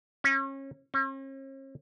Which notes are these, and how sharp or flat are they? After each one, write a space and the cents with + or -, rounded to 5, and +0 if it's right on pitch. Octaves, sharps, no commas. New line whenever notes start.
C#4 -30
C#4 -45